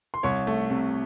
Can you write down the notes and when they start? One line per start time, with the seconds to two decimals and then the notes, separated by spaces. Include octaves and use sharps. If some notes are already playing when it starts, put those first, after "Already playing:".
0.14 C6
0.23 C2 C#5 C#6
0.47 A3
0.70 C3